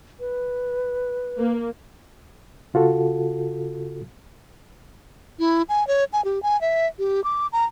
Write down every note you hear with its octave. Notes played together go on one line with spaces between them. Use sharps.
B4
A#3
C#3 F4 F#4 A4
E4
G#5
C#5
G#5
G4
G#5
E5
G4
D6
A#5